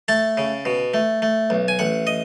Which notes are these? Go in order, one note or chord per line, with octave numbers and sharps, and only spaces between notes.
A3 A5
C#3
B2
A3
A3
B1
G#5
A1 F#5
D#5